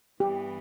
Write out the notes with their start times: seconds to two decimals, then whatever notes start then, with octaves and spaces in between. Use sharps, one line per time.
0.20 G2 E3 B3 G4